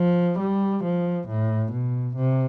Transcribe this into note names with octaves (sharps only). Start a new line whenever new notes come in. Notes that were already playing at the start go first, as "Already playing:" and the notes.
Already playing: F3
G3
F3
A2
B2
C3